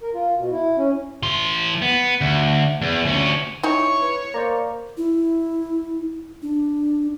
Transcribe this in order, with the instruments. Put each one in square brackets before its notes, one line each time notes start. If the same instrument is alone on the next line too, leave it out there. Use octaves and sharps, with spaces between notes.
[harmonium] A#4
F4
B2
E4
C#4
[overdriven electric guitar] E3 C6
B3
D2
E2
D2 C#4
[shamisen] D#4 D#5 G#5 [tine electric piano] E4 [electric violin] C#5 C#6
[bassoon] B4
[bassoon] A#3 [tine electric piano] C5 D5 A#5
[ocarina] E4
D4